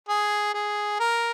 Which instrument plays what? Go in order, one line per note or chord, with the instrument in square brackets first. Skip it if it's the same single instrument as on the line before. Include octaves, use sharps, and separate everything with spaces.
[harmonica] G#4
G#4
A#4